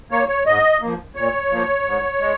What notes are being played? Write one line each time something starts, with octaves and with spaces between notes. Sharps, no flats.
A#3 C#5
C#5
G#2 D#5
F3 A#3
A#2 C#5
F3 A#3
G#2
G#3